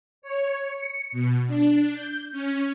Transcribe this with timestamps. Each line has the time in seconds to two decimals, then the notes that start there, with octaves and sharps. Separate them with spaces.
0.22 C#5
0.68 C#7
1.12 B2
1.48 D4
1.93 G6
2.32 C#4